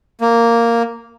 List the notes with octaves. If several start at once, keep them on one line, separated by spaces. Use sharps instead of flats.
A#3